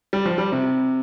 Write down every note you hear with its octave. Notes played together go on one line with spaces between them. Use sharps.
G3
F3
G3
C3